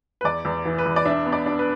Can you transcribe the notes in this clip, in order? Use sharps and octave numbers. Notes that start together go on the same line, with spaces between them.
B4
E2 D5
E2
E3
B4
E2
D5
D4 E5
B3
D5
D4
B4